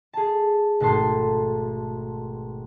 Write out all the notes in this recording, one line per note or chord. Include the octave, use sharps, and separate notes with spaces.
G#4 A5
G#1 B2 A3 A5 C6